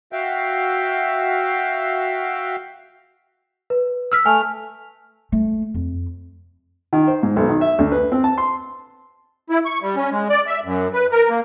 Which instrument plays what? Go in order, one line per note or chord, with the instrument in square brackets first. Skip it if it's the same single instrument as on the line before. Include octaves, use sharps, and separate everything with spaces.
[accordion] F#4 E5 F5 G5
[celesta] B4
E6 F6 B6
[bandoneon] A3 F6 [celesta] G#5
[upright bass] A3
F2
[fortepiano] D#3
C5
G#2
B1
D#3
E5
D2
B4
C4
A5
C6
[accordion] E4
C#6
G3
C#4
G#3
D5
E5
F#2
B4
A#4
A#3